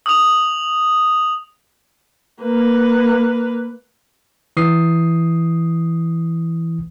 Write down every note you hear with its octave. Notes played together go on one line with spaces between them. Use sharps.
D#6 F7
A#3 B4
E3 D#6 C7